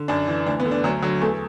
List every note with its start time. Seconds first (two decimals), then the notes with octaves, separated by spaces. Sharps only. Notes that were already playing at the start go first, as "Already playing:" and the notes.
Already playing: D3
0.08 F#2 D4
0.28 E3
0.46 D2 D4
0.60 B3
0.66 D3
0.71 D4
0.84 D2 F#3
1.02 D3 F#3
1.21 E2 A3